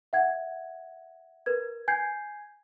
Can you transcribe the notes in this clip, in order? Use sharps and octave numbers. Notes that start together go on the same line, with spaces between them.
E5 F#5 G#6
A#4 B4 G#6
G#5 G6 G#6 C7